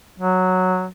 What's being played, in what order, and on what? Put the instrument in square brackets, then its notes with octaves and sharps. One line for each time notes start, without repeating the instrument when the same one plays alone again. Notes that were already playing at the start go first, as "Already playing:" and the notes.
[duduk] F#3